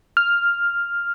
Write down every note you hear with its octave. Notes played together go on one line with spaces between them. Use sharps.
F6